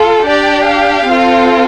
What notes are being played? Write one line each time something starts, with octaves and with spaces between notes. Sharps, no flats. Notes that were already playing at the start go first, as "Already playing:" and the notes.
Already playing: F4 A4
D4 G4 D5
F5
C4 F4 A4